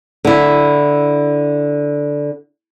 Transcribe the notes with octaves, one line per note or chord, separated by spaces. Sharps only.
D3 E4